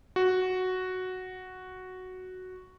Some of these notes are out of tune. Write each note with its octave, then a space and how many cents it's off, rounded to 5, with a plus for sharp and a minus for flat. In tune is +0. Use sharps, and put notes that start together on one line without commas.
F#4 +0